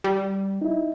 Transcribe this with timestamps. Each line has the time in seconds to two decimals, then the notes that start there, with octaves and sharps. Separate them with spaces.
0.04 G3
0.61 D#4 E4